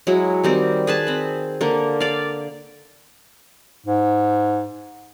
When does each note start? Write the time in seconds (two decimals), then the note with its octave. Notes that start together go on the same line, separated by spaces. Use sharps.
0.07 F#3 G#3 E4
0.44 D#3 G3 C4
0.87 G#4 B4 A5
1.07 C4 B5
1.61 D3 A#3
2.00 D5 F5
3.86 G#2